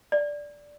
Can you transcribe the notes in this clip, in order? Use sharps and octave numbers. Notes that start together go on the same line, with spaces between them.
D5